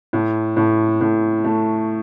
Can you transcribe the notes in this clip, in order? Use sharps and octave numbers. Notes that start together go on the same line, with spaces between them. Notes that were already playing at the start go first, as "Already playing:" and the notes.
A2
A2
A2
A3